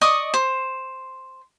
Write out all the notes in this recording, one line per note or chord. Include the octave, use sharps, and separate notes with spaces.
D5 D#5 C#6 D#6
C5